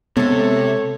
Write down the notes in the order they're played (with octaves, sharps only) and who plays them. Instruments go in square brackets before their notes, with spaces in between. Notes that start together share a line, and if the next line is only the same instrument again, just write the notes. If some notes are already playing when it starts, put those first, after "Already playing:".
[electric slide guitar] C3 [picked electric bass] G#3 B3 [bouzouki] A4 A5 [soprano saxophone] C#5